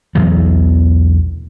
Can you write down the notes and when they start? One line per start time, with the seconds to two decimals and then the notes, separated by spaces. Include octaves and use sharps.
0.15 B1 E2 E3 F#3